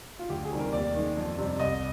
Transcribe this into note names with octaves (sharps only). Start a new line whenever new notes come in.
F4
D2 G4
G#4
C3 D#3 G3
A#4
D#2 D5
D#3 G#3
F2
C3 G3
C2 D#5